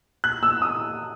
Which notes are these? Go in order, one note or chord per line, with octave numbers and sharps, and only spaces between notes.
F#6
E6
D#6